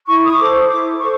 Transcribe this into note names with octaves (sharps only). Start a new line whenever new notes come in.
E4 C#6
D#6
A4 C5 D6
E4 D6
A4 C5 C#6